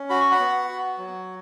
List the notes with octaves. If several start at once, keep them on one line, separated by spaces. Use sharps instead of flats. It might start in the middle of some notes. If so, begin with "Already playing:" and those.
Already playing: C#4
F#4 B5
C#6
F#5 B5
B3
F#4
F#3